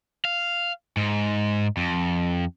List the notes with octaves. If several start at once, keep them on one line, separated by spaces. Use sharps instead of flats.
F5
G#2
F2